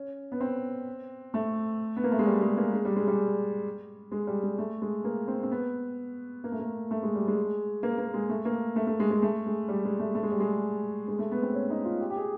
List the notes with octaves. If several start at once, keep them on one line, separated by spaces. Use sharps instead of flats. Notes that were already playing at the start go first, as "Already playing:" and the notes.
Already playing: C#4
B3
C4
A3
B3
A#3
A3
G#3
G3
G#3
A#3
G#3
G3
G#3
G3
G#3
G3
G#3
A3
G#3
A#3
C4
C4
B3
A#3
A3
A#3
A3
G#3
G3
G#3
A#3
A#3
G#3
A3
A#3
A3
A3
G#3
G#3
A3
G#3
G3
G#3
A3
A3
G#3
G3
G#3
G#3
A3
B3
C4
C#4
D#4
F4
G4
G4
G#4